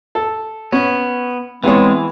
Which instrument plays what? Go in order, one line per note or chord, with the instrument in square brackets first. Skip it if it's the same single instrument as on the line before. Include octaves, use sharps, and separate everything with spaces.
[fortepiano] A4
[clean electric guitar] B3 [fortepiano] C#4
[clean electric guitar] E3 [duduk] G#3 [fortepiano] B3 G#4 C#5 [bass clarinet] C4